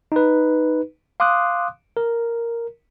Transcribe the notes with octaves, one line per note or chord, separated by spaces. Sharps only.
D#4 B4
F5 C6 D6 D#6 F#6
A#4